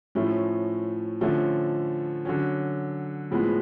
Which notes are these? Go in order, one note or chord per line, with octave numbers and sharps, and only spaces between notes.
A2 F3 A3 C#4
D3 F3 A3 C#4
D3 F#3 C#4
A2 F3 G#3 B3